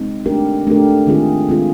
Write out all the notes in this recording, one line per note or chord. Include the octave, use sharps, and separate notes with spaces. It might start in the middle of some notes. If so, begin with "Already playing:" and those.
Already playing: G#3 C4 D#4
A3 D4 G4 A#4
A3 D4 G4 A#4
D#3 G#3 C4 F4 G#4
D#3 G#3 C4 F4 G#4